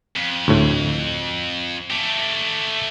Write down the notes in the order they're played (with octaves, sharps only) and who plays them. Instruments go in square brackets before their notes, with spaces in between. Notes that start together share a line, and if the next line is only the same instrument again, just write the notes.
[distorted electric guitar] F2
[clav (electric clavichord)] D2 A2
[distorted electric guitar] A3 G4